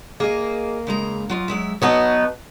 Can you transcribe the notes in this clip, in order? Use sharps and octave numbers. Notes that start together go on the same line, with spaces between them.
A#3 G#4 D#5
C#3 G#3 A#5
F#3 F4 D#5
F#3 G#3 E5
F#3 B3 D#4 F#4 B4 A5